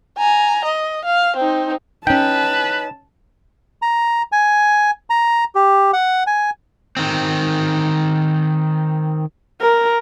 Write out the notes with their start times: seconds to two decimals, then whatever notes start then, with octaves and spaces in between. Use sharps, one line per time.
0.18 G#5 A#5
0.65 D#5
1.05 F5
1.36 C4 D#4
2.07 C#4 D#4 B4 G5 A5
3.82 A#5
4.32 G#5
5.10 A#5
5.55 G4
5.93 F#5
6.27 G#5
6.97 D#3 C4
9.61 A#4